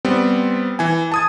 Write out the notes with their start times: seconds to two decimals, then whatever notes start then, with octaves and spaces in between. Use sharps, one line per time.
0.05 G3 B3 C4
0.79 E3 G#5
1.12 A5 D#6 G#6